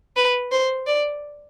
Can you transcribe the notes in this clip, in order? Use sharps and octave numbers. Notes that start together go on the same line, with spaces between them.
B4
C5
D5